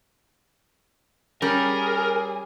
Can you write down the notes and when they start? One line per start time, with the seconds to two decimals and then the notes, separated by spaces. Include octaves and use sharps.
1.42 G3 C#4 G#4 A#4